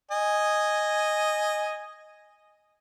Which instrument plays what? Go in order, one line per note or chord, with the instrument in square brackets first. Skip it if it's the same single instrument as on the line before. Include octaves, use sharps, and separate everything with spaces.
[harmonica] D#5 G#5